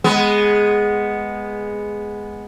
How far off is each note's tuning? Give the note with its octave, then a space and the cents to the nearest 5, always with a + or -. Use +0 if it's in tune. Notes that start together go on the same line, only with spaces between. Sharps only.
G#3 +0 B3 +0